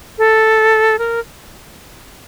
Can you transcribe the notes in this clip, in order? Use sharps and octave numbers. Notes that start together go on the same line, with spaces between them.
A4
A#4